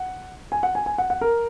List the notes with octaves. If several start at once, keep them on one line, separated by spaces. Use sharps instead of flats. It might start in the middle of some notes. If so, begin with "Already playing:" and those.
Already playing: F#5
G#5
F#5
G#5
G#5
F#5
F#5
A#4